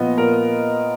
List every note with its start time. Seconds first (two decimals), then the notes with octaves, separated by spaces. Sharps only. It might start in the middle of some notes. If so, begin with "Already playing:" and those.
Already playing: A#2 F3 B3 D#5
0.18 A#2 A#4